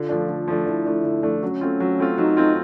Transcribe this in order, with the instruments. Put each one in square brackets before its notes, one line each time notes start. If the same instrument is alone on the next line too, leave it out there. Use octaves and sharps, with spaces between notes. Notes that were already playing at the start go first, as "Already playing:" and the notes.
Already playing: [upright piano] D3 [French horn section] F4
[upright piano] F3 A3 D4
D3
F3 A3 D4
[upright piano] D3 [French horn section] E4
[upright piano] F3 A3 D4
D3
F3 A3 D4
[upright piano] F#3 [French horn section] C#4
[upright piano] A3 C4 F4
F#3
A3 C4 F4
[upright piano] F#3 [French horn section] D#4
[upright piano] A3 C4 F4